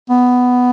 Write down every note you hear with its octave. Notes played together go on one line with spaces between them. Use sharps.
B3